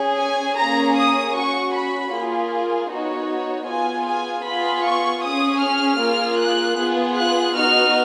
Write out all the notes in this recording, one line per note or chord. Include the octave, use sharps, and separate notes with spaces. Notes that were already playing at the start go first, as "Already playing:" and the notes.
Already playing: C#4 G#4
G#5
A#3 C#4 G#4 A#5
D#6
C#4 F#4 C#6
B5
A#3 F4 G#4
B3 D#4 F#4 C#5
B3 F4 G#4 G#5
G#5
B3 F4 G#4 B5
C#6
C#4 G#4 D#6
F6
A#3 F4 G#4
F#6
B3 F4 G#4
F#6
B3 D#4 F#4 F6